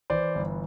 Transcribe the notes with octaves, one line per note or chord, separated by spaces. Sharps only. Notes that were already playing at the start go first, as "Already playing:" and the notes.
E3 C5 D5
G1